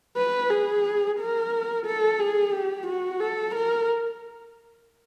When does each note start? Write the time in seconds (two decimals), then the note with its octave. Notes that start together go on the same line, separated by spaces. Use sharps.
0.17 B4
0.51 G#4
1.20 A#4
1.87 A4
2.20 G#4
2.53 G4
2.87 F#4
3.20 A4
3.55 A#4